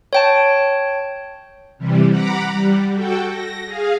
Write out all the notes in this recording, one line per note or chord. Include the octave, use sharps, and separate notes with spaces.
C#5 G5 A5
C3 E3 G3
F#5 A#5 B5 D6
G3
F#4 A4 G5
A#6
G#4 F5